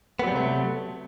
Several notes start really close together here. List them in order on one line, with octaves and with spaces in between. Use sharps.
B3 F#3 G3 C3 A3